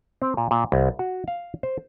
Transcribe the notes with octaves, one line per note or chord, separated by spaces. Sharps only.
C4
A#2
A#2
C2
F#4
F5
C5